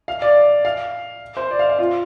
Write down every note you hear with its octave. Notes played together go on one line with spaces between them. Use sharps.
F5
D5
F5
C5
D5
F5
F5
F4